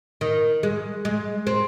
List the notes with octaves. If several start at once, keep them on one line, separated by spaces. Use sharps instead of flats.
D#3
G#3
G#3
C4